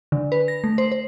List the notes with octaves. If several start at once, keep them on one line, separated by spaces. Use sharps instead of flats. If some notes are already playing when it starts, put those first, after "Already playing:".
D3
B4
A#6
A3
C5
C5